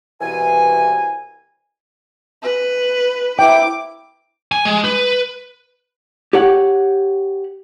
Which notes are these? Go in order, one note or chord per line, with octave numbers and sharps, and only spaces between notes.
C2 B2 E3 G#5
B4
E4 G5 D6
G#5
G#3
B4
G4 C#5 F#5